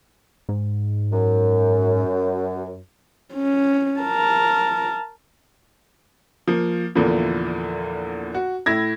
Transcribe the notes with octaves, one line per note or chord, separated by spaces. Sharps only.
G#2
F#2
C#4
A#4 A5
F3 A#3
E2 A#2 D3 E3 F3
F#4
A2 E4 G#6 A#6